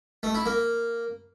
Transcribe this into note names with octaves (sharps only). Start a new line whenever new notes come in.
A3
E4
A#3